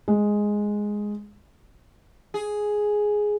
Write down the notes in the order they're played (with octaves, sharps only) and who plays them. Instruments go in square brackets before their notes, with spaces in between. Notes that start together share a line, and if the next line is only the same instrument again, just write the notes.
[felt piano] G#3
[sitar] G#4